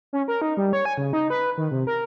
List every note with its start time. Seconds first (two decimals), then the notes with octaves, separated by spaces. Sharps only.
0.13 C#4
0.28 A#4
0.42 D#4
0.57 G3
0.73 C#5
0.85 G#5
0.98 C#3
1.13 D#4
1.30 B4
1.58 D#3
1.71 C3
1.87 A#4